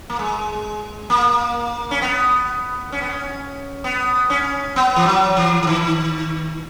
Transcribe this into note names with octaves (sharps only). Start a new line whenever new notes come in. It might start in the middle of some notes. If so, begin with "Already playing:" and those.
A#3
G#3
A#3
C#4
B3
C#4
B3
C#4
B3
C#4
B3
E3
F#3
E3
E3
D#3